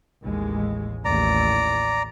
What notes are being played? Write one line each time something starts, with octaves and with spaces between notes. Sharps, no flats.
A1 D#2 G#3
A1 D#2 D5 A#5